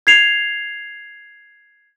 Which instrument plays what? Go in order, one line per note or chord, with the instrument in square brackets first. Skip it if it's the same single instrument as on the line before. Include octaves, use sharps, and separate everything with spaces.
[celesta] G#6 C7 F7